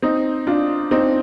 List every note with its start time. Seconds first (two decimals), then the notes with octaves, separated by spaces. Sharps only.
0.02 C4 D#4
0.47 D4 F4
0.91 C4 D#4